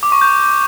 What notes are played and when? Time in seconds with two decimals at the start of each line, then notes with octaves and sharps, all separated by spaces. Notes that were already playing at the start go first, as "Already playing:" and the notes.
0.03 D6
0.12 C#6
0.21 G6